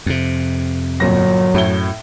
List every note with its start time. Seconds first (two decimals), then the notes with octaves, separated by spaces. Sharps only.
0.06 F2 C3
1.00 G1 A#2 F#3 A#6
1.54 F#2 A2 G7